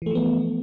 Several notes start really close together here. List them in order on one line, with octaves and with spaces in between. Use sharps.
E3 A3 F3 B3